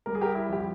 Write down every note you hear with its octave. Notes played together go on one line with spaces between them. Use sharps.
G3 A#4
G#4
G4 A#4
E4
F2 G4